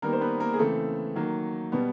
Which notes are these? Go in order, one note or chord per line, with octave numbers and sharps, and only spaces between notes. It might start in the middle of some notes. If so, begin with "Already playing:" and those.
D#3 G3 A#3 B3 A#4
C5
B3 B4
A#3 A#4
G#4
C#3 E3 A3 C4 A4
D#3 F#3 A#3
B2 G3 B3